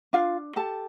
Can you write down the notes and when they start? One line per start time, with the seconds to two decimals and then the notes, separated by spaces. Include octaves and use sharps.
0.13 D4 F4 F5
0.56 G4 A4 A5